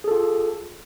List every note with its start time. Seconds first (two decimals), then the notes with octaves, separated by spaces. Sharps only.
0.04 G#4
0.08 A4
0.11 F4